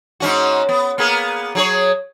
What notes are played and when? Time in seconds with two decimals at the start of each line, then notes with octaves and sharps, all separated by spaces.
0.20 G#2 C#4 F#4
0.69 B3
0.98 A#3 B3 G#4
1.55 F#3 G#4 C#5